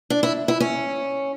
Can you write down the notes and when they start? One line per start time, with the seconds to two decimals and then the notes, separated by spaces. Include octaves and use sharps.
0.10 D4
0.23 E4
0.48 E4
0.60 C#4